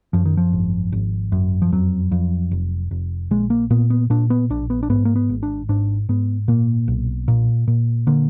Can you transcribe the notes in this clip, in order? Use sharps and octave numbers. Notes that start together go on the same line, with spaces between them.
F#2 F3
D#3
F3
G#1
G#1
F#2
F3
F2 F#3
F2
F1
F1
A#1 G#3
A#3
A#2 B3
B3
A#2 D4
B3
A#1 D4
B3
D4
G#2 B3
A#3
B3
G#1
D4
G#2 D4
G#2 B3
A#2 A#3
B1
A#2
A#2
D3 A#3